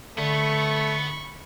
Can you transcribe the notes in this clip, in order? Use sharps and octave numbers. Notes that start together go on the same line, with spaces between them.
D3 A3 B3 B5 C#6